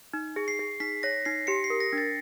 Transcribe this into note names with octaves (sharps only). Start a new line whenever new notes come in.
D#4
G#4
C7
G#4
D#4 B6
C#5 A#6
D#4 C7
G4 C#7
C7
A#4
A#6
D4 A6